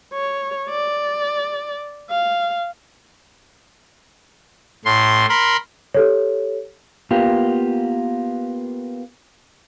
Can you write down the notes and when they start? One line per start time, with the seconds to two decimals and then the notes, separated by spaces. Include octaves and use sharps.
0.13 C#5
0.69 D5
2.10 F5
4.85 A2 C6
5.29 A#4 B5 C6
5.94 G4 A4 C#5
7.11 A#3 B3 F4 G4